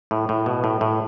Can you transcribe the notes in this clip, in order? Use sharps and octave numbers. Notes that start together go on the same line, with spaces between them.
A2
A2
B2
A2
A2